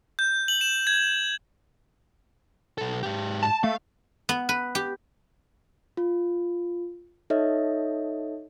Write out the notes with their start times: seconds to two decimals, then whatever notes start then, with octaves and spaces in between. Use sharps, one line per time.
0.19 G6
0.48 F#7
0.61 E7
0.87 G#6
2.78 B1 A4
3.03 G#2 G4
3.43 A5
3.64 A3 F5
4.29 B3
4.49 B4
4.75 G4
5.97 F4
7.30 D#4 A4 C#5 D#5 E5